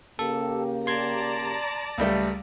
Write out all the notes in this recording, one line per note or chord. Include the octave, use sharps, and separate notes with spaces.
C#3 A#3 G4 A4
D5 A5 A#5 C6 G#6
C#2 G3 A3